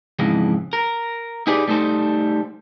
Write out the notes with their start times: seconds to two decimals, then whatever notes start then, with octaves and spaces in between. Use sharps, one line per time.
0.19 F2 G#2 C#3 E3
0.73 A#4
1.47 D#4 G4 G#4 B4 D5
1.68 G3 A3 D#4 A4 C5